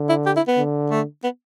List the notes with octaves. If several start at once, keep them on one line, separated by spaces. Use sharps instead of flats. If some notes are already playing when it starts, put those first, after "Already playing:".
Already playing: D3
E4
G4
E4
B3
D3
A3
B3